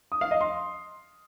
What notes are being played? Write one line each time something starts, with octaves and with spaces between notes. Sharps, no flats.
D#6
F5
D#5
C6